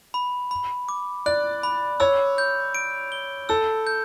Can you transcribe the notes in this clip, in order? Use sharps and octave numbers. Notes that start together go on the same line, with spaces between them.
B5
B5
D6
D5 F#6
B5
C#5 E6
G6
D7
G7
A4 E6
G6